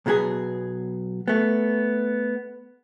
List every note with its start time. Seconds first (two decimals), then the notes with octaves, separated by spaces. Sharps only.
0.06 B1 B2 F#3 B3 G#4
1.28 A3 B3